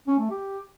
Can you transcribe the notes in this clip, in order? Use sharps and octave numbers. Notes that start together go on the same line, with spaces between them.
C#4
A3
G4